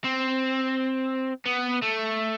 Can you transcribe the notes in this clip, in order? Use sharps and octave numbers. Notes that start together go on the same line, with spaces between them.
C4
B3
A3